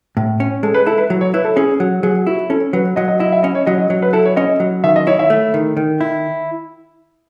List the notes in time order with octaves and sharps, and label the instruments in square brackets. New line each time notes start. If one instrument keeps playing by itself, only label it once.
[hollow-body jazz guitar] A2
C#4
[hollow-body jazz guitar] G#3 [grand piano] A4
[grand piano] B4
[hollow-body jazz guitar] E4 [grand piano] A4
[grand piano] B4
[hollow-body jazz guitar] F#3
[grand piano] C#5
[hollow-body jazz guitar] E4 [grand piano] B4
[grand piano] A4
[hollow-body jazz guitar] C#4 [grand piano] G#4
[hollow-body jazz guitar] F#3
[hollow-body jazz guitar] F#3 [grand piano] G#4
[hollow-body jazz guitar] E4 [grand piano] F#4
[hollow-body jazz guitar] C#4 [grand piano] A4
[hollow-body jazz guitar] F#3 [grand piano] B4
[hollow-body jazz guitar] F#3 [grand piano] D#5
[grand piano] D#5
[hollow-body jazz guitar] E4 [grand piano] D#5
[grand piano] E5
[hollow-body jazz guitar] C#4 [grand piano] D#5
[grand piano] C#5
[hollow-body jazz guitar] F#3 [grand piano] D#5
[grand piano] D#5
[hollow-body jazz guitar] F#3 [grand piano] C#5
[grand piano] B4
[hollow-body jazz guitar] E4 [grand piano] A4
[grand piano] C#5
[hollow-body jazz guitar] C#4 [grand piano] D#5
[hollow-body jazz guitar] F#3
[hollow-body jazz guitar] D#3 [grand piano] E5
[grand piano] D#5
[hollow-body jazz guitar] E4 [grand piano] C#5
[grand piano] E5
[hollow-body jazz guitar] A3
D#3
D#3
E4